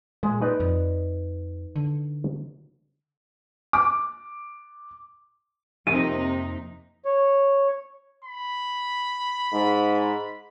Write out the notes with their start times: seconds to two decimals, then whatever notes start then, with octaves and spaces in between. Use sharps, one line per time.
0.23 A#2 G#3
0.42 D#4 B4 D5
0.60 F2
1.76 D3
3.73 D6
5.87 F2 C3 A#3 D#4 D#7
7.05 C#5
8.25 B5
9.53 G#2